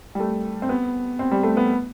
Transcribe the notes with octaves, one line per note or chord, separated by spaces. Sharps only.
G3
A3
C4
B3
C4
G3
A3
B3